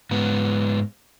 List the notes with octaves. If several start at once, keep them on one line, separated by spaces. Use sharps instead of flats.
G#2 B3